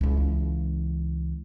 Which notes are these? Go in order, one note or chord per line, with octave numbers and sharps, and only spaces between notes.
C#2 E3